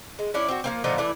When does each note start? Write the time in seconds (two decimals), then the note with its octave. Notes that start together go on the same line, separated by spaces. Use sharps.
0.19 G#3
0.34 C#4 D4 E4
0.48 C4 F#4
0.64 F3 A#3 C4
0.84 A#2 D3 F3 D#4
0.98 E3 A3 D4 E4